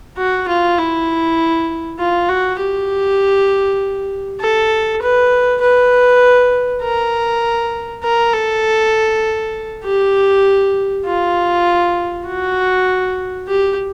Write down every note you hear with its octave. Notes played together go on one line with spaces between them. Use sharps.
F#4
F4
E4
F4
F#4
G4
A4
B4
B4
A#4
A#4
A4
G4
F4
F#4
G4